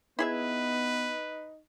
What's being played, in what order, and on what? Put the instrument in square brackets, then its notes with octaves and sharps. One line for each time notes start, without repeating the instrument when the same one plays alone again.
[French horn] B3 [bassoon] D#4 [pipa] E4 G#4 E5 [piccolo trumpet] B4